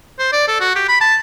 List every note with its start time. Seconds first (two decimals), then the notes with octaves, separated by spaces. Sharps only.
0.19 C5
0.33 D5
0.48 A4
0.60 F#4
0.75 G4
0.88 B5
1.01 A5